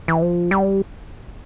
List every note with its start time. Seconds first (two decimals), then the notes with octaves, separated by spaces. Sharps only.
0.08 E3
0.22 F3
0.51 G3